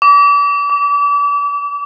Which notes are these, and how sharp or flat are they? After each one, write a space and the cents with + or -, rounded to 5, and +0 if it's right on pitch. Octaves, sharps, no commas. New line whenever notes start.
D6 -35
D6 -20